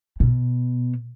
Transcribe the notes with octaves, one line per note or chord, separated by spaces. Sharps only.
B2